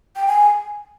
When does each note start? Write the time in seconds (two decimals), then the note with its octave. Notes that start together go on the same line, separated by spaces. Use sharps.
0.16 G5
0.27 G#5